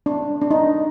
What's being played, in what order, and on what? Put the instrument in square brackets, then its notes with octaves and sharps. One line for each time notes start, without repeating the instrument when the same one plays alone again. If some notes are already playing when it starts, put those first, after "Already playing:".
[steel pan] D4
D4
D#4